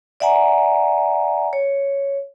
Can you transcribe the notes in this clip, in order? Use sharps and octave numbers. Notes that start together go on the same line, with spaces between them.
D5 E5 F#5 G#5 A#5
C#5